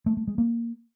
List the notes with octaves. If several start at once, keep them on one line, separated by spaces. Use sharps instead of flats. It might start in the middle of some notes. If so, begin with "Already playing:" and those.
A3
A3
G#3
A#3